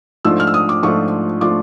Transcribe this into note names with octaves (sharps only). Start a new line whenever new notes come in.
G#2 F3 A3 D4 F4 E6
F6
E6
D#6
D6
G#2 F3 A3 D4 F4 C#6
F3 A3 D4 F4 D6